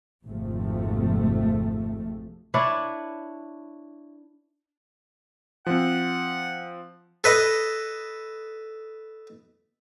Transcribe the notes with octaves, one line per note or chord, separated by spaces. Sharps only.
G#1 F2 G#2 C3 F3 A3
D4 E4 B4 C#5
F3 C4 F#5
A4 B4 D#5